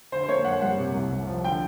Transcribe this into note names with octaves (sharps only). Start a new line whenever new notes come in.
D3 C5
C5
A#3 C#5
F#2 F#5
G3 F#5
C3
C2
C2
F3
D3 G5